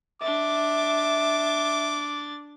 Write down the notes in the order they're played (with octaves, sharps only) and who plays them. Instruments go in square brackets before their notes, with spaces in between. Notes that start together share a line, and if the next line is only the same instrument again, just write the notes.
[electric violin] D4 A6 [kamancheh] E5 [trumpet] D6